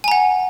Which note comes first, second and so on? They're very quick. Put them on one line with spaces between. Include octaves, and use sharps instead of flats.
G#5 A#5 F#5